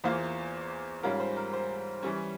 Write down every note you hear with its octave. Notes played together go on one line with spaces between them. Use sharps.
E2 E3 A#3 F4 C5
G#2 G3 C#4 F4 A#4
C5
A#4
C5
E3 G3 C#4 C#5